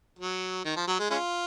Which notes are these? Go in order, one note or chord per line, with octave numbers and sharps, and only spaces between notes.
F#3
D#3
F3
F#3
G#3
G#3 C#4 F4